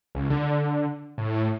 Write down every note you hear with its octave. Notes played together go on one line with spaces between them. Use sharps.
C#2
D3
A2